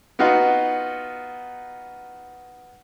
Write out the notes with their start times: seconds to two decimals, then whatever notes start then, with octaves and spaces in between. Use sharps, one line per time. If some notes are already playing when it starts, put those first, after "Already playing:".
0.19 B3 D#4 F4 F#4